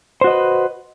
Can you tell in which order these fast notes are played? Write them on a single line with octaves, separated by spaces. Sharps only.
C5 F#4 D#5 B4